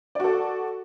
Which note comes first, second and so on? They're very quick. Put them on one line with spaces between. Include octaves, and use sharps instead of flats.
D5 F#4 A4